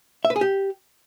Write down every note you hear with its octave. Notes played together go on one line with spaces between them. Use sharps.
E5
B4
G#4
G4